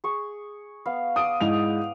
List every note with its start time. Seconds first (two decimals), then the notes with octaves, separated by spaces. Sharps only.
0.04 G#4 C#6
0.86 B3 F5
1.16 D5 A5 D#6 D7
1.41 G#2 E4 F7